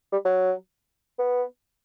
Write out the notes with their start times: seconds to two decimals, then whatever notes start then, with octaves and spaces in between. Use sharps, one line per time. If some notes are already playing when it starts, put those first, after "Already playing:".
0.12 G3
0.25 F#3
1.19 B3